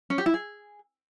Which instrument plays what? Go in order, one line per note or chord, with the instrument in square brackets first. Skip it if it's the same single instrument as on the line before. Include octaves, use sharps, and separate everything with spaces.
[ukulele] C#4
G4
E4
G#4